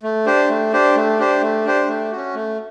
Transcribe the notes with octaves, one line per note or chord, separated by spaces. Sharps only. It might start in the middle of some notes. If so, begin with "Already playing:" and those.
A3
D4 G4 C5
A3
D4 G4 C5
A3
D4 G4 C5
A3
D4 G4 C5
A3
C#4 F#4
A3